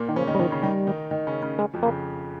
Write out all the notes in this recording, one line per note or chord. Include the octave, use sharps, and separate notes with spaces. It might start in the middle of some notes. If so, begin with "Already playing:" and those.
Already playing: A#2 A#3
D#3
C#3 F3 C#4
D#3 D#4
G3
D#3 F3 D#4
C#3 C#4
D#3 G3 D#4
D#3 D#4
D#3 D#4
C#3 C#4
C#3 C#4
G#3
F2 F3
A#3
C#3